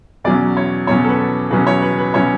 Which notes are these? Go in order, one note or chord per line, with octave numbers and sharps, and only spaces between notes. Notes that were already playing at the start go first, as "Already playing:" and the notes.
E2 B2 F#3 C#4 D5
C#5
E2 B2 F#3 C#4 C#5
A4
B4
E2 B2 F#3 C#4 B4
C#5
B4
B4
B2 F#3 C#4 C#5